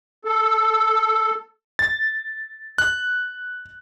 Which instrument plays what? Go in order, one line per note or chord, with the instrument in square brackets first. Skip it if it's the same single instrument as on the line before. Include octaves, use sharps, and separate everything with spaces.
[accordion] A4
[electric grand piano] A6
F#6